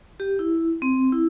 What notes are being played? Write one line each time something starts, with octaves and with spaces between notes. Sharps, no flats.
G4
E4
C4
E4